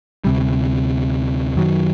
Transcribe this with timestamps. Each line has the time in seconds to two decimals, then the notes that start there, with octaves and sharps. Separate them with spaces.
0.25 D2 C3 G3
1.56 F#2 D#3 F#3